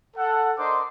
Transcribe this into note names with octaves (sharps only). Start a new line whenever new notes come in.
A4 F#5
D4 A#4 C5 D#5 C6 D6